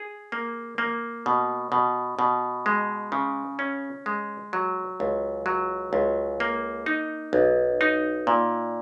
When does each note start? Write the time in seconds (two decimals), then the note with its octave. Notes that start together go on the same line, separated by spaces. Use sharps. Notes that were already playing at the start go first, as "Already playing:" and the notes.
Already playing: G#4
0.32 A#3
0.78 A#3
1.26 B2
1.72 B2
2.19 B2
2.66 G#3
3.12 C#3
3.59 C#4
4.06 G#3
4.53 F#3
5.00 C#2
5.46 F#3
5.93 C#2
6.40 A#3
6.86 D#4
7.33 B1
7.81 D#4
8.27 A#2